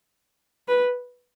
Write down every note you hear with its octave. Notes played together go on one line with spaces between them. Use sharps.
B4